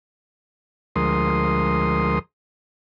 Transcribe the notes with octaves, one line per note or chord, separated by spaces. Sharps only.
D2 F3 G#3 A#4 C6 D#6